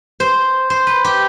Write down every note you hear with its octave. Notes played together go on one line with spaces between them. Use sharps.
C5
C5
B4
G4